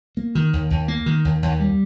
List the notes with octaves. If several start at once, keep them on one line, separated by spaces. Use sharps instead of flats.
A#3
D#3
D#2
D#2
A#3
D#3
D#2
D#2
G3